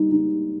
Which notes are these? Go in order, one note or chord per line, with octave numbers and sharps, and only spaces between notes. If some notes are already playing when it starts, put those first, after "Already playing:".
Already playing: G3 D#4
D#4